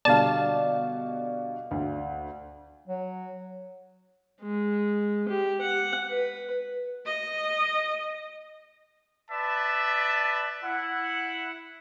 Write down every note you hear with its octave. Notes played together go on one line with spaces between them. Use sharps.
B2 D3 G3 D5 F5 A5
D2
F#3
G#3
G4
F#5
B4
D#5
B4 D5 E5 A5
E4 F#5